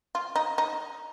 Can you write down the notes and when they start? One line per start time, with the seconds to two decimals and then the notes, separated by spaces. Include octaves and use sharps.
0.15 F4
0.36 D#4
0.58 D#4